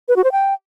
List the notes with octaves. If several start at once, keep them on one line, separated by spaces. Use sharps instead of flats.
B4
F#4
C5
G5